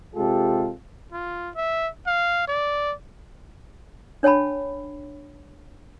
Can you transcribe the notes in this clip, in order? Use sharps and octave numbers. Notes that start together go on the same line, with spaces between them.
C3 G#3 F4 G4 A4
F4
E5
F5
D5
D4 C#5 G5 A5 B5